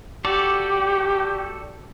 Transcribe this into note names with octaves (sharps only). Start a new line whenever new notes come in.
F#4 G4 A4 D5